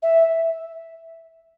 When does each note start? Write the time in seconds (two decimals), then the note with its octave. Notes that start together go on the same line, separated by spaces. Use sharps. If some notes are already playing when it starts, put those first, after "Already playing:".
0.02 E5